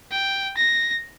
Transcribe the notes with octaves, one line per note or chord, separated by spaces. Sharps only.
G5
A#6